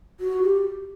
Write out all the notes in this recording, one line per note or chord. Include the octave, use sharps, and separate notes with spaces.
F#4
G4